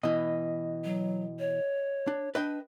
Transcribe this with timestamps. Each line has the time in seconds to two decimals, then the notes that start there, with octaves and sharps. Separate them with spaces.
0.03 B2 E3 D#5
0.84 F#3
1.39 C#5
2.07 D4
2.35 D4 B4 D#5 G5